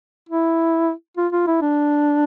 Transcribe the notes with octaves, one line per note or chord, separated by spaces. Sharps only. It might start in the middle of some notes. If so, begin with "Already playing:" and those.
E4
F4
F4
E4
D4